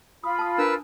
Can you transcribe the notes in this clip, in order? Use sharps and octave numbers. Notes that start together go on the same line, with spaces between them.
F4 B5 D#6
A5 D#6
D4 A#4 B4 E6